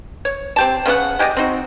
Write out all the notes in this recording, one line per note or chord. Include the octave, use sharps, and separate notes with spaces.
C#5
C4 G4 A5
C#3 B3 D#4 F#5
G#3 G4 D5 D#5
C4 D#4 F#4